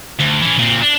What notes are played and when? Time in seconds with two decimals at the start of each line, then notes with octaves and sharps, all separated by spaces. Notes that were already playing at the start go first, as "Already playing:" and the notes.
0.19 D2
0.42 E3 C#4
0.59 A#2 C4
0.82 D4